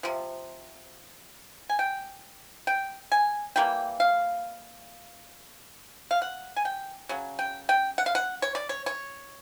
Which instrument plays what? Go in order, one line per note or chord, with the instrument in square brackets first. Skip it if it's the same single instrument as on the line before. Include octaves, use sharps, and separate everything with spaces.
[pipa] C3 F3
G#5
G5
G5
G#5
E3 G3 A#3 G5
F5
F5
F#5
G#5
G5
C#3 F#3
G5
G5
F#5
F5
F#5
C#5
D5
C#5
C#5